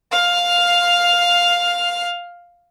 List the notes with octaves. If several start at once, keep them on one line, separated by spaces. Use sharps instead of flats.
F5 F6